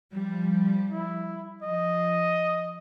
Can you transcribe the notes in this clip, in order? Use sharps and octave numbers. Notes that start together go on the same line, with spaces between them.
F3 G3
E4
F3 D#5